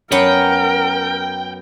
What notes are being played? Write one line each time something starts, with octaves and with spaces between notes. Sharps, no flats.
F#2 B3 A#4 C#5 F#5 G5